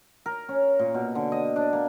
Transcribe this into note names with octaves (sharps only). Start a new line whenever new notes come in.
A#4
C#4
A#2
B2
D3
D#5
D4
A#3